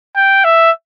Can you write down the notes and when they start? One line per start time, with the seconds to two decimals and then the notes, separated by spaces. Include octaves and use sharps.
0.16 G5
0.44 E5